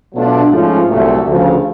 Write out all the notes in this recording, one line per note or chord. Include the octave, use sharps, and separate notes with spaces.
B2 F#3 A3 D4 F4
G#2 F3 A3 C#4 F4
C2 A#2 F#3 A3
D2 C#3 F3